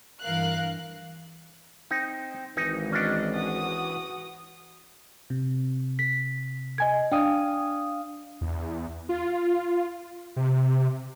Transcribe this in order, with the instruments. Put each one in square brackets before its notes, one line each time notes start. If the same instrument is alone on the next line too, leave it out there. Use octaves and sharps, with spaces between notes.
[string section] G2 E3 A#4 F5 F#6
[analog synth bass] C4 [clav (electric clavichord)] D#4
[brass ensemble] G#1 [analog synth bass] E3 [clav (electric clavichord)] D#4
[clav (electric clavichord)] C#4 D4 [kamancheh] D5 D#5
[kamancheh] F#4 D#6
[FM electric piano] C3
[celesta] B6
D#5 G#5 G#6
[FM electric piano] D4 F5 D#6 [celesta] G5
[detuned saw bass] E2
F4
C3